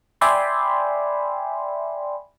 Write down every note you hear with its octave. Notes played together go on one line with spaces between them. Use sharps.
D5 E5 G5 G#5 B5 C6